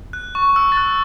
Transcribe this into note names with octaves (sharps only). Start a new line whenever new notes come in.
F#6
C#6
C#6
E6
A6
F#6